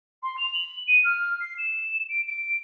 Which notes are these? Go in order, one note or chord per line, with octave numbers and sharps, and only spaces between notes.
C6
F7
F#7
D#7
F6
C7
E7
D7
D7